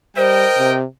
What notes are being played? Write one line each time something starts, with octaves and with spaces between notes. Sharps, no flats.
G3 A#4 C5 D#5 G5
C3